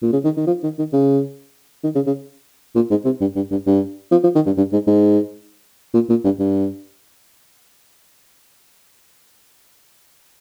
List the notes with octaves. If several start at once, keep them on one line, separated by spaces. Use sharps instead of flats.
A#2
C#3
D#3
D#3
F3
D#3
D#3
C#3
D#3
C#3
C#3
A#2
G#2
C3
G2
G2
G2
G2
F3
F3
D#3
G2
G2
G#2
G#2
A#2
A#2
G2
G2